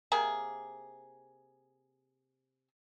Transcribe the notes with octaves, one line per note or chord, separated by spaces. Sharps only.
C3 A#3 G#4